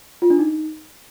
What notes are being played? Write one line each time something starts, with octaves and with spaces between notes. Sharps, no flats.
F4
D4
D#4